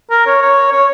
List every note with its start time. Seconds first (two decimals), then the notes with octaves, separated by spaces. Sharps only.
0.10 A#4
0.26 C#5
0.42 C#5
0.72 C#5